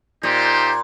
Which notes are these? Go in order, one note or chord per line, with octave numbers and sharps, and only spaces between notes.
A#2 D#4 G4 C5